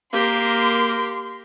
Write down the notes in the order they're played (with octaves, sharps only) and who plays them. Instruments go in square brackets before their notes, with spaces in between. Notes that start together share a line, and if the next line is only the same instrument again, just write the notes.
[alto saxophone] A#3 [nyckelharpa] G4 A#4 [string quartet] C6